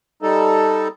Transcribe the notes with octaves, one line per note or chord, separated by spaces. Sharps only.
G3 D#4 A4